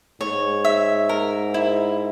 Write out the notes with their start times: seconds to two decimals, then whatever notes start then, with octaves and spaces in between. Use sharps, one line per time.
0.20 G#2 C#5
0.65 E5
1.09 A#4
1.54 E4